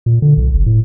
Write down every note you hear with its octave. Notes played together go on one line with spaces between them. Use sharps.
A#2
D3
B1
F#1
A2